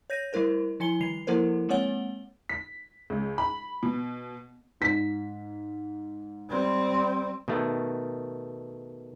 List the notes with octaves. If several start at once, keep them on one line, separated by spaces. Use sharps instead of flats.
C#5 G6 A#6 D#7
G3 A3 E4 A#4 C5
F3 E4 G#5 C#7 G7
D#3 G3 C7 F7
F3 A#3 E4 A4 A#4 C5
G#3 A#3 C4 C#5 F#5 G7
B6
C#2
B5
B2
G#2 B6
G3 C4
B2 D#3 A3